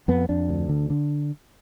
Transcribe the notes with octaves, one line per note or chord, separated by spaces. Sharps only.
F2 B3
F2 D4
D2
D3
D3